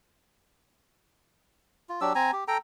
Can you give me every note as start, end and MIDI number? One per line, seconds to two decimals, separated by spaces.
1.89 2.00 65
2.01 2.13 54
2.01 2.13 62
2.01 2.13 67
2.01 2.13 88
2.15 2.31 60
2.15 2.31 80
2.15 2.31 82
2.33 2.44 67
2.48 2.58 69
2.48 2.58 79
2.48 2.58 82